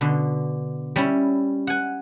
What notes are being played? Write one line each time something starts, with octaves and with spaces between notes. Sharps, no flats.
B2 D3
G3 C#4 E4
F#5 G#5